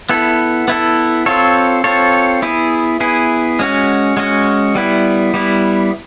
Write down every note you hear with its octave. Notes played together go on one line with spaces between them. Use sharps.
B3 E4 A4
B3 E4 A4
C4 F4 A4 C#5
C4 F4 A4 C#5
B3 E4 G#4
B3 E4 G#4
G#3 C#4 F#4
G#3 C#4 F#4
G3 B3 E4
G3 B3 E4